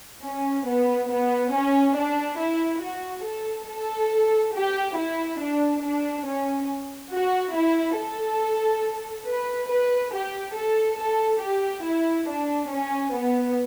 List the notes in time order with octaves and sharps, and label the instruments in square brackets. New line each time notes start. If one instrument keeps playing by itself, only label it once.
[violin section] C#4
B3
B3
C#4
D4
E4
F#4
A4
A4
G4
E4
D4
D4
C#4
F#4
E4
A4
B4
B4
G4
A4
A4
G4
E4
D4
C#4
B3